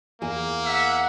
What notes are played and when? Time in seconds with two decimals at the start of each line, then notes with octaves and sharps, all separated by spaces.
0.22 E2 A#3 E4 G#4
0.65 E5 F#5